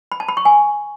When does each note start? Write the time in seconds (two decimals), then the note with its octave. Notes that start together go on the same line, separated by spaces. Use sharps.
0.12 B5
0.20 A5
0.28 B5
0.37 C#6
0.45 G#5